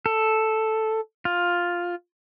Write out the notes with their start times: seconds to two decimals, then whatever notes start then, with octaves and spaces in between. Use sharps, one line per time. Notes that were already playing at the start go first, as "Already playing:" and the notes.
0.06 A4
1.25 F4